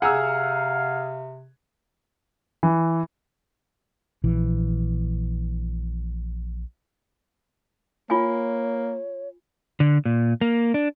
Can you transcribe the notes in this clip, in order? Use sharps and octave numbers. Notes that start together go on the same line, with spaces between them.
C3 G#4 F5 F#5 A#5 E6
E3
A#1 E3
A#3 F4 C#5 G#5
D3
A#2
A#3
D4